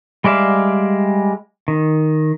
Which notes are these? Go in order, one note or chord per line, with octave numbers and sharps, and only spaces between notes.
G3 G#3 D5 E5 F5
D#3